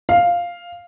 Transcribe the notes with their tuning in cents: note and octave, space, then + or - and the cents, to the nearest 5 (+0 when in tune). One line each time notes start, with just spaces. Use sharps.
F5 +0